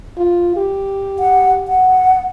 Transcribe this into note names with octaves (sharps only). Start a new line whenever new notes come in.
F4
G4
F#5
F#5